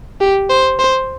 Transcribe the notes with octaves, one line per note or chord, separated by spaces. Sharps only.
G4
C5
C5